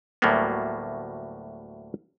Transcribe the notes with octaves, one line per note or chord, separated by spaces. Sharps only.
D2 A2 F#3 G3 A#3 B3